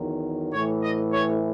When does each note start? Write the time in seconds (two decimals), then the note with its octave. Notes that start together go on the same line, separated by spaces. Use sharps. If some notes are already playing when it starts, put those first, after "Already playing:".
Already playing: E2 D#3 F#3
0.52 A2 E3 C#5
0.82 D#5
1.13 C#5